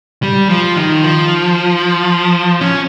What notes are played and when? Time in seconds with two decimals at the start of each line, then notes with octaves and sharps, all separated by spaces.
0.23 G3
0.49 F3
0.76 D#3
1.02 F3
2.61 C#4